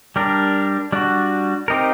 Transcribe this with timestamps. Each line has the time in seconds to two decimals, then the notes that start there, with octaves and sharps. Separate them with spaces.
0.16 G3 D4 G4 A#4
0.92 G3 D4 F#4
1.68 C4 D#4 G4 A#4